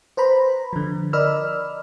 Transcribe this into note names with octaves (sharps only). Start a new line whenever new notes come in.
B4 C5 A#5 B5
D3 F3
A#4 D5 D#5 B5 E6 F6